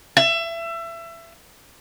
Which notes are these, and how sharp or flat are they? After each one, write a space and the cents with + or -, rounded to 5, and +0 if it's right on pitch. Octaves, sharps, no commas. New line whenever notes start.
E5 +25